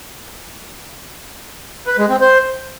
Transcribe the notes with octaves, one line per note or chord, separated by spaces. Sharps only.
B4
G#3
C4
C5